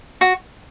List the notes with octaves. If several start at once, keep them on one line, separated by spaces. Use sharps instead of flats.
F#4